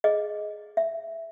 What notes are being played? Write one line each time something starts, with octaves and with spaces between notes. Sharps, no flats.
G#4 D#5
E5